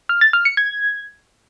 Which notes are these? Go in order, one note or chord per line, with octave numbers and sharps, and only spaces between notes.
F6
A6
F6
C#7
G#6